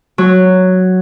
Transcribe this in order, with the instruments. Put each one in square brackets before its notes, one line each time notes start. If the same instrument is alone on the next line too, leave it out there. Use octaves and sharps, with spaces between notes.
[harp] F#3